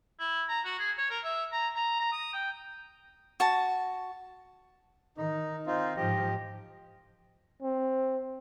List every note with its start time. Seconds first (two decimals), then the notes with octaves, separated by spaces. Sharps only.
0.20 E4
0.49 A#5
0.65 F#4
0.79 G#4
0.98 C#5
1.10 A#4
1.24 E5
1.52 A#5
1.75 A#5
2.00 A#5
2.13 D#6
2.34 G5
3.40 F#4 A5
5.17 D#3 D#4
5.66 C4 D#4 F4
5.96 G#2 F3 G4 D#5
7.63 C4